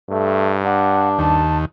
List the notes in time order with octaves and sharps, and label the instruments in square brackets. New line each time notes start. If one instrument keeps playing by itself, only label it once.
[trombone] G2 [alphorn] A3
[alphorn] D4 [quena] F#5
[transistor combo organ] D#2 [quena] A5